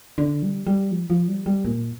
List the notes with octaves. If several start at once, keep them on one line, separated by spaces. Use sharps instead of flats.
D3
G3
G3
F3
F3
G3
G3
A#2